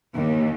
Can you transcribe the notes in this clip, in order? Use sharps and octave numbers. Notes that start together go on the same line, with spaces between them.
D#2